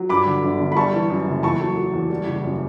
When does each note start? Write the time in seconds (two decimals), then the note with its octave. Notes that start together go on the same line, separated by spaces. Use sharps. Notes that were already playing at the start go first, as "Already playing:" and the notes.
Already playing: F#3
0.09 G2 B5 D6
0.27 D3
0.43 G1
0.60 G1
0.72 B5
0.76 G3 A5 C#6
0.94 E3
1.10 F#2
1.27 F#1
1.43 E2 A5 C#6
1.60 F#3
1.77 F#3
1.93 E2
2.10 G3
2.27 F#1
2.44 F#2